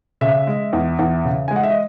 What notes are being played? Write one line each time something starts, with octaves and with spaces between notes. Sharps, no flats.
C#3 E5
G#3
E2
E2
C#3
G#5
G#3
F#5
E5
D#5